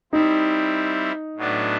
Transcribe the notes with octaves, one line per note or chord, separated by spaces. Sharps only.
G3 C4 D#4 E4
A2 F#3 B3 D4